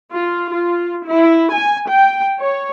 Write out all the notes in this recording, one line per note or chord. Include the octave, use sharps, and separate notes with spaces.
F4
F4
E4
G#5
G5
C#5